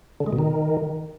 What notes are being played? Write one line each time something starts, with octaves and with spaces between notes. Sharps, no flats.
D3
G#3
B2
D#3